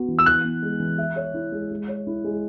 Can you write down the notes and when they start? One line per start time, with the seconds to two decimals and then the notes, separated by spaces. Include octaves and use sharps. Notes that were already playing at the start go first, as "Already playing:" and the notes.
Already playing: B3 F#4
0.08 E3
0.19 E6
0.26 E3 F#6
0.45 B3
0.62 G#3
0.80 E3
0.98 E5
1.16 C#5
1.34 E4
1.52 G#3
1.71 G#3
1.88 C#5
2.07 E4
2.24 G#3